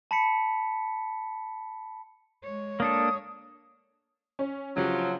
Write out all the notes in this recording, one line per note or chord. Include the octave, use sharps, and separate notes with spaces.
A5 B5 B6 C#7
G#3 C#5
A#3 D4 A4 D#6
C#4
A#1 C#3 F3 F#3 G4